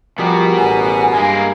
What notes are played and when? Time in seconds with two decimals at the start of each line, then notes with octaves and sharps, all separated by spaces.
0.18 B2 F3 G3 B3 F#4 G#4 A#4
0.58 A1 G#5
1.14 G2 G#3 A#3